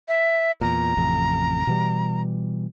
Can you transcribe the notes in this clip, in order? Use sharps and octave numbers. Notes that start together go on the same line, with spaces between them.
E5
E2 A#2 A#5
A1 F2 C3
B2 E3 G3